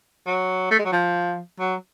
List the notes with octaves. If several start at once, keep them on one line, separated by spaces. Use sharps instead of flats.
F#3
A3
G#3
F#3
F3
F#3